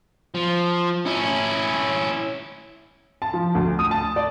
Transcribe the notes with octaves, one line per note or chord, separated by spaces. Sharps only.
F3
C#4 E4
A5
F3
D2
D#6
A5
D5